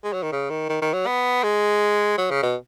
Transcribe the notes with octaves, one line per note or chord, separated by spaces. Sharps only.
G#3
F#3
D#3
C#3
D#3
D#3
D#3
F#3
B3
G#3
F#3
C#3
B2